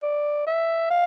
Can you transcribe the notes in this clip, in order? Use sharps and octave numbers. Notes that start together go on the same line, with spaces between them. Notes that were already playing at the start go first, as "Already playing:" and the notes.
D5
E5
F5